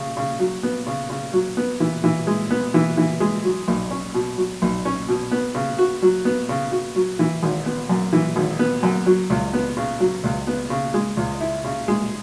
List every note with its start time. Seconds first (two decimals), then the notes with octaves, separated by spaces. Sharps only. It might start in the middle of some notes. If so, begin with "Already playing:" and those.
Already playing: C#3
0.17 C#3
0.40 F#3
0.63 B3
0.87 C#3
1.10 C#3
1.33 F#3
1.57 B3
1.80 E3
2.04 E3
2.27 G#3
2.51 B3
2.74 E3
2.97 E3
3.20 G#3
3.45 F#3
3.68 B1
3.91 C#4
4.14 B2
4.38 F#3
4.62 B1
4.85 C#4
5.09 B2
5.32 B3
5.55 C#3
5.78 F#4
6.02 F#3
6.25 B3
6.49 C#3
6.72 F#4
6.96 F#3
7.19 E3
7.43 G#1
7.66 B3
7.89 F#2
8.13 E3
8.36 G#1
8.59 B3
8.83 F#2
9.06 F#3
9.30 C#2
9.53 B3
9.77 C#3
10.00 F#3
10.24 C#2
10.47 B3
10.70 C#3
10.94 G#3
11.17 C#2
11.41 E4
11.64 C#3
11.88 G#3